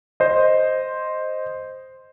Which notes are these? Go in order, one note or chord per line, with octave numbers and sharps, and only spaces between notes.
C5 D#5